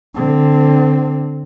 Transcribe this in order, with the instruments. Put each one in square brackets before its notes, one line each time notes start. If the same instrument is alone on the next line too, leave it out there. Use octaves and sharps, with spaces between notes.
[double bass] D3 C4